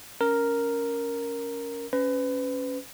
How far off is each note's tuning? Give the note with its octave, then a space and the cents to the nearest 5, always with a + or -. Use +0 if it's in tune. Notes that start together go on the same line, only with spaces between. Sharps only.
C#4 +10 A#4 +0
C#4 +0 B4 +30